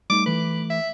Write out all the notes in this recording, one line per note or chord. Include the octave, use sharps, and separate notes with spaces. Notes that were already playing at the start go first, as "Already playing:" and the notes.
G3 A3 D#4 D6
E3 A3 B4
E5